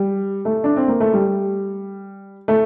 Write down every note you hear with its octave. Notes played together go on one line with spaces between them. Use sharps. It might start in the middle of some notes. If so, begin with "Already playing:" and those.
Already playing: G3
A3
D4
C4
A#3
A3
G3
A3